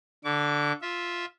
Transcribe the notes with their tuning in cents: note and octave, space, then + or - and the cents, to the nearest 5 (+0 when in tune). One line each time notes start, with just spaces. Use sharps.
D3 +0 D6 -40
F4 +0 E5 -10